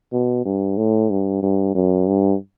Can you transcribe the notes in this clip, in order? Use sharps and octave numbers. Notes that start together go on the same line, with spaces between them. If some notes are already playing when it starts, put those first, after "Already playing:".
B2
G2
A2
G2
G2
F#2
G2